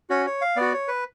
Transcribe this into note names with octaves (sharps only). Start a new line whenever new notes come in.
C#4 F#4 C#5
C#5
F5
B3 F#4 D5
C#5
B4